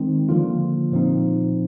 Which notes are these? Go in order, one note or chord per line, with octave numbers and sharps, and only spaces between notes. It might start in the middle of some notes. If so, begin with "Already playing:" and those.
Already playing: D#3 G#3 C4 D#4
D3 F3 A#3 F4
A#2 F3 C4 D#4